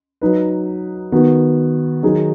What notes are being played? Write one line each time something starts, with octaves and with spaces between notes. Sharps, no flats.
F#3 D#4 B4
D#3 B3 F#4 B4
D#3 F#3 D#4 G#4